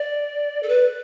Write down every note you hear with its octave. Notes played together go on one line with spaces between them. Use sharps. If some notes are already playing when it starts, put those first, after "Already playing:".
Already playing: D5
A4
B4